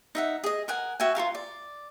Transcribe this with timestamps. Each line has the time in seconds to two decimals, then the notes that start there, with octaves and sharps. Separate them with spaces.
0.15 D#4 E5 F#5
0.44 G#4 D#5
0.68 A#4 F#5 G#5
1.00 F#4 E5 G5 G#5
1.15 F4 F#4 A#4 F5
1.35 D5